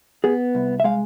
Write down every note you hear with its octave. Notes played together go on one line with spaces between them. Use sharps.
B3 G#4
C2
E5
G#3 F5